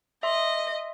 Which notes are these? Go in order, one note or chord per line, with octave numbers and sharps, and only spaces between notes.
D#5 E5 C6